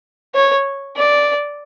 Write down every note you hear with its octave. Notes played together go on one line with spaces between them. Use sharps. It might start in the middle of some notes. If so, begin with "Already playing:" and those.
C#5
D5